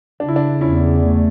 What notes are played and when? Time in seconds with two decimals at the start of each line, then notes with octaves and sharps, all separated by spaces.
0.20 C#3 D4
0.28 E4
0.36 D4
0.61 E2 C#4 E4
1.03 A3